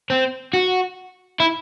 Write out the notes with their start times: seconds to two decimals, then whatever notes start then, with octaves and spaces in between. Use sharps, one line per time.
0.10 C4
0.53 F#4
1.40 E4